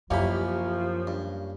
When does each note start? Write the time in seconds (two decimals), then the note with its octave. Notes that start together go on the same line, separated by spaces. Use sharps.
0.10 A1 F#2 C3 F3 A#3 C#4 G4 B5
1.07 G2